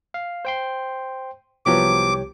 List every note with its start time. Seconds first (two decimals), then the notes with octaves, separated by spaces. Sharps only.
0.14 F5
0.45 C5 G5 C6
1.66 C2 F3 F#3 B3 G4 C#5 D6